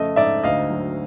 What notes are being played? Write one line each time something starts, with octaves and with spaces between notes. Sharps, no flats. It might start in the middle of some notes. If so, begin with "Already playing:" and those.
Already playing: F2 C#3 A3 D#5
G#2 D5 E5
D2 D#5 F5
F#3